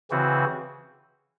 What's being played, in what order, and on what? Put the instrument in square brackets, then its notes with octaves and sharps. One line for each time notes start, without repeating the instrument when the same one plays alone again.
[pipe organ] C#3 E3 C4 F#4